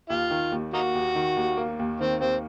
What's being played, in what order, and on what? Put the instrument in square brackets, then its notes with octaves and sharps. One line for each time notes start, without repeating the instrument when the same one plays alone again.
[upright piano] D#2 [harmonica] F4
[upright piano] D#3
D#2
[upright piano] A#3 [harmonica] D#4 F#4
[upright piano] D#2
D#3
D#2
A#3
D#2
[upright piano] D#3 [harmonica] C4
[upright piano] D#2 [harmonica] C4